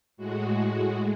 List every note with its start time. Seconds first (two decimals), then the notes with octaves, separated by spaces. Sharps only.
0.17 A2 G#3 F#4